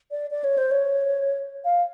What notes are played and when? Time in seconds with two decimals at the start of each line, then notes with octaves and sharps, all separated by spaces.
0.11 D5
0.31 D5
0.44 C#5
0.58 C5
0.71 C#5
1.65 F5